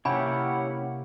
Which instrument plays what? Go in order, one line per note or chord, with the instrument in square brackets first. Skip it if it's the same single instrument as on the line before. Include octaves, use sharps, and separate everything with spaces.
[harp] C3 A#3 [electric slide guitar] C#4 E4 G4 [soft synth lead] F#5 [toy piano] G#5 B5